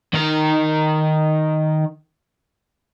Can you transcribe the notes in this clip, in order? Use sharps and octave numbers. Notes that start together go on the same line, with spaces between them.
D#3 A#4